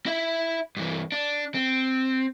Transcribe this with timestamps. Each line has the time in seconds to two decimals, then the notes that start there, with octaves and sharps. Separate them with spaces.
0.06 E4 E5
0.77 G2 E3
1.12 D4
1.55 C4